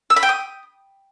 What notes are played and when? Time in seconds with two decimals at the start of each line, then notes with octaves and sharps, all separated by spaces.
0.10 E6
0.16 B5
0.23 G5
0.29 D#6